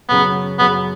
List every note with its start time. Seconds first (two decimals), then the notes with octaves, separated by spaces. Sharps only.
0.08 F#2 C#3 F#3 B3
0.59 F#2 C#3 F#3 B3